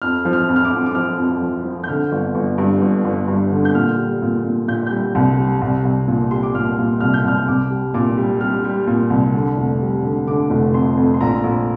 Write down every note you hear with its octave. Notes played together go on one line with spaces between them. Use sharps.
F2 F6
F3
F6
F2
F6
D6
F2
D6
F3 F6
F2
F3
F3
G6
D3 F6
G1
G1
G2
G1
G1
G2
D3
G6
A#2 F6
G3
A#2
A#2
A#2 G6
G3 G6
C2
G3
C2
C2
A#2
G3 C6
D6
A#2 F6
A#2
C2 F6
G6
C2 F6
C2 D6
G3
A#2 D6
G3
G3 F6
G3
A#2
C2
D3
F1
G3
D3
D3 D6
F1
F2 C6
F2
C6
A#1 A#5
A#1